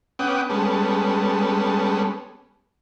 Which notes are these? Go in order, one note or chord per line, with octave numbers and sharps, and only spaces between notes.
B3 C#4 F#5 G5 D6 D#6
G3 G#3 B3 C#4 A4